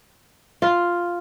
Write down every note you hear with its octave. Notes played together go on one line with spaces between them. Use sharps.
F4